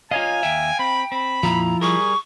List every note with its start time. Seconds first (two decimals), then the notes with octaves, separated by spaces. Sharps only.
0.11 F4 C#5 D#5 F5 G#5 A#5
0.43 D#2 E5 G5
0.79 C4 B5
1.12 C4 B5
1.43 F2 A#2 F3 E4 A#5
1.81 G3 G#4 A#4 C#6